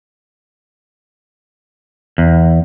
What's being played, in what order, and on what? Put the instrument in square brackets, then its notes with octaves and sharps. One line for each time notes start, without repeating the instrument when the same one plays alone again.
[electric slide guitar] E2